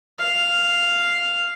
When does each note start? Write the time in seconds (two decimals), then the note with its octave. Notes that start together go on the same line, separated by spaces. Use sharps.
0.19 F5